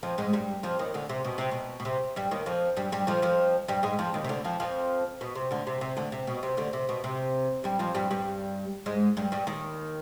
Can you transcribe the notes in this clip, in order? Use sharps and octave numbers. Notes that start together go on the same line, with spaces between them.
F2 F3
G#2 G#3
G2 G3
F2 F3
D#2 D#3
D2 D3
C3
B2
C3
B2
B2
C3
G2 G3
D#2 D#3
F2 F3
G2 G3
G2 G3
F2 F3
F2 F3
G2 G3
G#2 G#3
F2 F3
D#2 D#3
C3
D2 D3
F2 F3
F2 F3
B2
C3
D2 D3
C3
C3
D2 D3
C3
B2
C3
D2 D3
C3
B2
C3
G2 G3
F2 F3
G2 G3
G2 G3
G#2 G#3
G2 G3
G2 G3
D#2 D#3